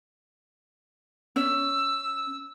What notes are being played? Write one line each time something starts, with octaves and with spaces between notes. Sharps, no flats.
C#4 E6